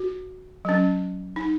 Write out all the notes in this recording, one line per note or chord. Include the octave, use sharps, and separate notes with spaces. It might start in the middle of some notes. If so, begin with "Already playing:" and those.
Already playing: F#4
F#3 C#4
D#4